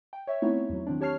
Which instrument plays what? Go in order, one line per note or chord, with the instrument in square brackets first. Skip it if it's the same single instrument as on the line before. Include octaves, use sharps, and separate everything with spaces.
[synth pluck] G5
C#5 E5
A3 B3 C4 D#4 E4 C#5
E2 F#3
D#3 C4 D4
G4 C#5 A5 F6 C7